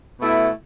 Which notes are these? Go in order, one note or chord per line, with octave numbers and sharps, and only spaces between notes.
B2 A3 E4